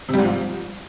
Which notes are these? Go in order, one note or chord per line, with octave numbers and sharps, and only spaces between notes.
C3
G3
G#2
F3